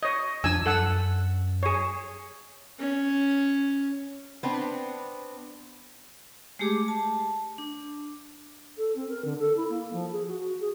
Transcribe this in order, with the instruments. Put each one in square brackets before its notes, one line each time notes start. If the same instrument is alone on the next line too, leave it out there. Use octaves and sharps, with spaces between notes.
[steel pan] C#5 D#5
[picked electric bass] F2 F3 D4 [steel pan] G#5 E6
[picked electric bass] F#2 [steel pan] A4 F#5 E6
[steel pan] G#4 C#5
[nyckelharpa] C#4
[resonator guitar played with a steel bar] B3 C4 D4
[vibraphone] G#3 A3 G4 G#4 D6
A5
D4
[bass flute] A4
C4
A#4
D3
A4
E4
A#3
F3
G#4
F#4
F#4
G#4